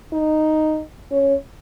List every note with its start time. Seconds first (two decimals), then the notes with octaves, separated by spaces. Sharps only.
0.13 D#4
1.11 C#4